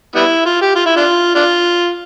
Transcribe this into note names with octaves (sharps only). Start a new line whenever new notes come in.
G3 B3 E4
F4
G4
F4
E4
D4 F4
D4 F4